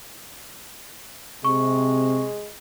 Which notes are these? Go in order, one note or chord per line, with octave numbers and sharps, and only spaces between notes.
C3 G#3 C#6